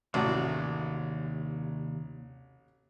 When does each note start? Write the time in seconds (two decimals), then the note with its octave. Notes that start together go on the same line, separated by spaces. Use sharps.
0.14 A1 D#2 C3 F#4 D5